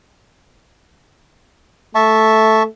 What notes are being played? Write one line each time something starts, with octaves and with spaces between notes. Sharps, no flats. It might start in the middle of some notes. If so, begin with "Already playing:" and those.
A3 E5 A5 C#6